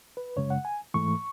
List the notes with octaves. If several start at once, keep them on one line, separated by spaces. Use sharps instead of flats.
B4
F#2 C#3 G#3 C#5
F#5
G#5
G#2 E3 A3 C#6